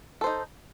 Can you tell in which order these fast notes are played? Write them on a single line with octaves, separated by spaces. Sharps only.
A4 C5 D#4